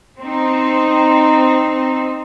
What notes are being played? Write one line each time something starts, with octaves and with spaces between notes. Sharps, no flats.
C4 D#4